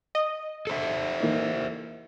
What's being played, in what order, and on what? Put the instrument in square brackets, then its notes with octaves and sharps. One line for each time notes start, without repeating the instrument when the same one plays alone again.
[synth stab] D#5
[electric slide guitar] A4 C5 E5
[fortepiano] E3 A#3 D#4